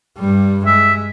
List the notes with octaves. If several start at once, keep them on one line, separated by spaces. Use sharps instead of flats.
G2 G3
G#3 E5